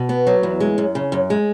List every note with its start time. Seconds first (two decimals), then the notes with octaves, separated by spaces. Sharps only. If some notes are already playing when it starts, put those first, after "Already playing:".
Already playing: B2
0.09 B3
0.27 F#3
0.43 E2
0.60 G#3
0.78 F#2
0.95 C#3
1.12 F#2
1.30 G#3